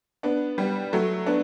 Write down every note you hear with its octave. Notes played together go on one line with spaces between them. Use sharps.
B3 D4
G3 B3
F#3 A3
B3 D4